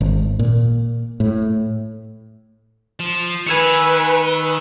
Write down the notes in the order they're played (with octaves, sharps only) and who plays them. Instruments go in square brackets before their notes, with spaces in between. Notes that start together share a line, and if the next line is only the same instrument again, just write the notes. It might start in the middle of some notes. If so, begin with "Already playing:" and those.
[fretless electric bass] G#1
A#2
A2
[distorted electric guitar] F3
[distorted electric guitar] D#3 [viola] B4 [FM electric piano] G#5 E6 C#7